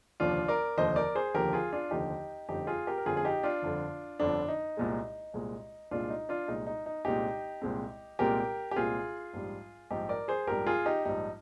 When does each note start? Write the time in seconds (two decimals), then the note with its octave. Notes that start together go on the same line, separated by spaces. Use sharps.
0.20 F1 D#2 D3 F3 D4 F4
0.48 A#4 D5
0.78 F1 D#2 D3 F3 C5 D#5
0.96 A#4 D5
1.15 G#4 C5
1.34 F1 D#2 D3 F3 G4 A#4
1.53 F4 G#4
1.73 D4 F4
1.91 F1 D#2 D3 F3 D#4 G4
2.49 G1 F2 D3 D#4 G4
2.67 F4 G#4
2.87 G4 A#4
2.98 A#4
3.05 G1 F2 D3 F4 G#4
3.17 G#4
3.25 D#4 G4
3.43 D4 F4
3.62 G1 F2 D3
4.20 G1 F2 D3 D4
4.48 D#4
4.77 C2 A#2 G#3
5.34 C2 A#2 G#3
5.91 C2 A#2 G#3 D4 F4
6.10 D#4
6.29 D4 F4
6.48 C2 A#2 G#3 D#4
6.67 D#4
6.86 D#4
7.05 C2 A#2 G#3 C4 D#4 G4
7.62 C2 A#2 G#3 C4
8.19 C2 A#2 G#3 C4 G4 A#4
8.71 G4
8.76 C2 A#2 G#3 C4 F4 G#4
9.33 A#1 G#2 G3
9.91 A#1 G#2 G3 D#4 G4
10.09 A#4 D5
10.28 G#4 C5
10.47 A#1 G#2 G3 G4 A#4
10.66 F4 G#4
10.86 D#4 G4
11.05 A#1 G#2 G3 D#4